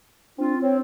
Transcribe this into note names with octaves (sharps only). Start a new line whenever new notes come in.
C4 D4 F4
C4 C#5